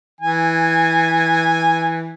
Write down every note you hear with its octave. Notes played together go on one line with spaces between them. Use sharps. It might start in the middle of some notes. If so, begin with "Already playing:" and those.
E3 G#5